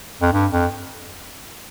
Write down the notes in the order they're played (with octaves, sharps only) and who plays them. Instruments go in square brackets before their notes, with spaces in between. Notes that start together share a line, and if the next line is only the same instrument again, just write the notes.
[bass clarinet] F2
G2
F2